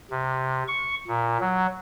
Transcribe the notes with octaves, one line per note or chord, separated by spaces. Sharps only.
C3
C#6
A#2
F#3